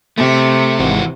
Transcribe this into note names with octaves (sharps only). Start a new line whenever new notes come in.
C3 A3
G#1 E3 F#4